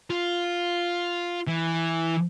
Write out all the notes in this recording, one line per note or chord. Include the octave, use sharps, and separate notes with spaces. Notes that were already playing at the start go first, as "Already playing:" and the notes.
F4
E3